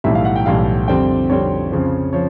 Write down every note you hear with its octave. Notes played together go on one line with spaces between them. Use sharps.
B1 A2 E3 G3 E5
F5
F#5
G5
B1 A2 E3 G3 F5
F2 D3 G3 C4 G5
F2 D3 G3 C4 C#5
F2 C#3 F3
F3 C#5